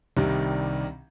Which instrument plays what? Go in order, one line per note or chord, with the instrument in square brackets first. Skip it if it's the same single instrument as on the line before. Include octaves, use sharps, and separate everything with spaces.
[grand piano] C2 C3 D#3 G3 D4